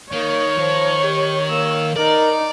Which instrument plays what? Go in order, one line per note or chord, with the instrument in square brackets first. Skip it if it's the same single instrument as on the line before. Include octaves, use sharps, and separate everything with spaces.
[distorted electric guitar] D#3 [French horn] A#3 [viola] C#5
[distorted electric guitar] D#3 [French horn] F3
[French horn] G4
[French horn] A#3 [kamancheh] E6
[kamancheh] D#4 [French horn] A#4 [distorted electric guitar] D5